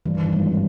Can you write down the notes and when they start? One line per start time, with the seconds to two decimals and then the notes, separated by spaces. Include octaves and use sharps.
0.06 G2 E3
0.15 D#3
0.24 E3
0.33 G#1 G3